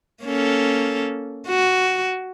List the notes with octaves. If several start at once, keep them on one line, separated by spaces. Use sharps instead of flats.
A#3 C#4 A4
F#4